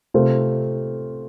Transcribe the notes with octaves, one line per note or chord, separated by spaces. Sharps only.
C3 A3 F4 C5